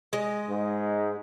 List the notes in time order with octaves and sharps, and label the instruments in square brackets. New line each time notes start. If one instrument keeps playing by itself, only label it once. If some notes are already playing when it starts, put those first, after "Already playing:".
[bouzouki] G#3 D#5
[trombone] G#2